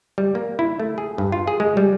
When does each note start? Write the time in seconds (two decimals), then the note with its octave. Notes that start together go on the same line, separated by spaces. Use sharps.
0.18 G3
0.35 A#3
0.59 E4
0.80 A3
0.98 G#4
1.18 G2
1.32 F4
1.47 G#4
1.60 G#3
1.77 G3